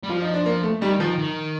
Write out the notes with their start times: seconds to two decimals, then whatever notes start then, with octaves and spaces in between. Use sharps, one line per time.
0.04 G3
0.09 F3 F4
0.22 D#4
0.34 D4
0.46 A#3
0.63 A3
0.82 D#3 G3
1.00 D#3 F3
1.18 D#3